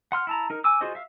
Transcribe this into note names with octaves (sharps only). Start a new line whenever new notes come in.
F#5 C6 F6
E4 A5 A#5
D#4 A#4
G#5 D6 E6
F4 F#4 G#4 C5 D#5
E5 F5